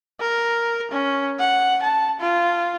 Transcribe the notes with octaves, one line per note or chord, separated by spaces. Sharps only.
A#4
C#4
F#5
A5
F4